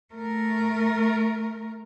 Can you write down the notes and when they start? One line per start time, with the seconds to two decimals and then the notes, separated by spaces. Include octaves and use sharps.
0.14 A3 A#4